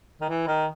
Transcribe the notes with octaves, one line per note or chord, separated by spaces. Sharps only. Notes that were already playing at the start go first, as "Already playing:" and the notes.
D#3
E3
D#3